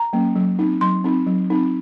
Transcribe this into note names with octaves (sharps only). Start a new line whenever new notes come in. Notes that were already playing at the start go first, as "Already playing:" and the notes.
Already playing: A#5
F#3 A#3 C#4
F#3
C4 D#4
F#3 C6
C4 D#4
F#3
C4 D#4